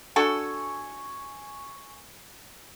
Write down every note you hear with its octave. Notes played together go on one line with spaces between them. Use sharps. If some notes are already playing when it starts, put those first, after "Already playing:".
D4 F#4 A4 G#5 C#6